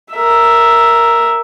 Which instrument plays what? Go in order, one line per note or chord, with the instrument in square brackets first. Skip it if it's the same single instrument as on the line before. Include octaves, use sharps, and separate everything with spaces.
[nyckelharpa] A#4 E5